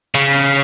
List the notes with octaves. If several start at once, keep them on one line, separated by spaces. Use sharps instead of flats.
C#3